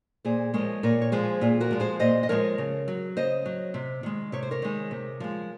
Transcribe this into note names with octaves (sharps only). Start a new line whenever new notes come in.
A#2 G#4 C5
F3 G#3 A#4 C#5
A#2 A#4 C#5
C#5
F3 G#3 G#4 C5
A#2 F4 G#4
F#4 A#4
F3 G#3
G#4 C5
A#2 C5 D#5
D#5
F3 G#3 A#4 C#5
C#3
F#3
C#3 C5 D#5
F#3
C3
D#3 G#3
C3 C#5
C5
A#4 C#5
D#3 G#3
C3
F3 G#3